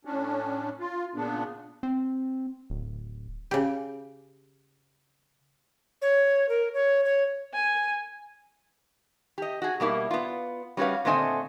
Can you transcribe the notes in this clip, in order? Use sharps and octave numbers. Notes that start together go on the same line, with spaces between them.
A2 C#4 D4
F4
A#2 C#3 B3 D4
C4
D1
C#3 G4
C#5
A#4
C#5
C#5
G#5
G4 D#5
F#4 G#4
B2 G3 A#3 E4
B3 F4
G3 C#4 F#4 G4 B4 F5
A#2 D3 A3 C4 D#5 G#5